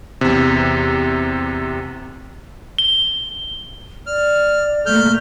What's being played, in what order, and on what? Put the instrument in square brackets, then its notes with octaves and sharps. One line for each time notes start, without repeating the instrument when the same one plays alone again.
[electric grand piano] E2 C3
[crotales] G7
[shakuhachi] D5 [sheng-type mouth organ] F6
[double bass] A3 A#3 [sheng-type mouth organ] F6 G6